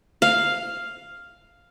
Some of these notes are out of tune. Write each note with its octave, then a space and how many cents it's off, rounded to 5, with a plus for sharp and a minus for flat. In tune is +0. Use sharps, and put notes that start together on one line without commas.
F5 +0